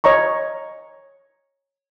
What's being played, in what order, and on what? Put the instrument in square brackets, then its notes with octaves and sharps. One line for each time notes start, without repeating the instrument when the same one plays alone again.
[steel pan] C#5 D#5 A#5 C#6